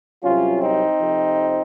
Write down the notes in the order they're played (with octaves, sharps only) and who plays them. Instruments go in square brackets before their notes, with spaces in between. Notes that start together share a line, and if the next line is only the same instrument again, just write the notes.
[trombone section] C2 C3 F#3 C#4 F4
C4 D#4
F2 C3 F3